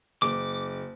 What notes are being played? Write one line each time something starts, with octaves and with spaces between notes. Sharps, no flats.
F#1 D6